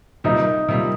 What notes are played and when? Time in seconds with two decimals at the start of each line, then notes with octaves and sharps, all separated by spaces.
0.24 C3 D#3 G3 A#3 D#4 F4
0.69 C3 D#3 G3 A#3 F4